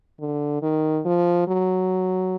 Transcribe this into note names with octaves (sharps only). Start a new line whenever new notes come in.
D3
D#3
F3
F#3